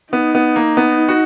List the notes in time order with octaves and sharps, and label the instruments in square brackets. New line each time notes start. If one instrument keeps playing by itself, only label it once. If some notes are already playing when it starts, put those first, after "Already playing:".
[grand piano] B3 [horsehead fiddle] D#4
[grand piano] B3
A#3
B3
F#4